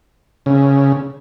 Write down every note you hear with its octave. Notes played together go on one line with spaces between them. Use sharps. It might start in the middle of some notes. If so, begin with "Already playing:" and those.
C#3